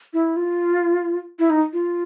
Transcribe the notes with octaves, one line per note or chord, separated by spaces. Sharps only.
E4
F4
E4
D#4
F4